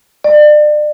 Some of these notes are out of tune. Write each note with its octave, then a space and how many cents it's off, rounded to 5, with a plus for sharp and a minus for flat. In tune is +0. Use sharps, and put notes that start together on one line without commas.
D5 +35